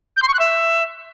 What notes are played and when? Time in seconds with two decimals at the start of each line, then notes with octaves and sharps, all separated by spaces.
0.17 G6
0.22 C6
0.28 C#6
0.34 F#6
0.39 E5